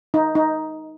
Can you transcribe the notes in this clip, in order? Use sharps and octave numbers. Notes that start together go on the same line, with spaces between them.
D#4
D#4